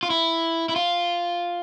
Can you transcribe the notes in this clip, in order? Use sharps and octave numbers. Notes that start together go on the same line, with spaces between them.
F4
E4
E4
F4